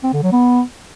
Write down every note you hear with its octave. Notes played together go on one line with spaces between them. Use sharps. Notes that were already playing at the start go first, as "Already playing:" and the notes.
C4
D3
F#3
B3